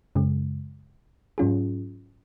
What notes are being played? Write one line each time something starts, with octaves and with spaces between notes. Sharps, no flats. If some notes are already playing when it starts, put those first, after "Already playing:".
F#2 C#3 G#3
G#2 F#3 C#4 F4 G#4